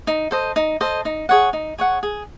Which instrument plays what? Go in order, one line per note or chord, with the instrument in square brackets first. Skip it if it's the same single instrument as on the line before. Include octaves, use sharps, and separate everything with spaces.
[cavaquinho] D#4
A4 C5 D#5
D#4
A4 C5 D#5
D#4
G#4 C#5 F#5
D#4
G#4 C#5 F#5
G#4